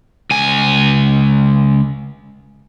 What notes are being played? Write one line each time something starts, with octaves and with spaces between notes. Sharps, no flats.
C#2 G#5